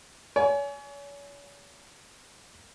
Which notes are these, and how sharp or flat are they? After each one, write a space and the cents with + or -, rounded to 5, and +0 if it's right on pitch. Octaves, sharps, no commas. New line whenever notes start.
C#5 +40 G#5 +15